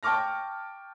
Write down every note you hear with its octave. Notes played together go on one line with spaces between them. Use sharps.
G5 A5 C#6 D6 F6 A#6